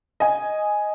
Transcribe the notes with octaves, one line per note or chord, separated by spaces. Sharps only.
D#5 G#5